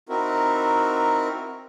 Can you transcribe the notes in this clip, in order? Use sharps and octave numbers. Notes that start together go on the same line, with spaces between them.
C4 D#4 E4 F#4 A#4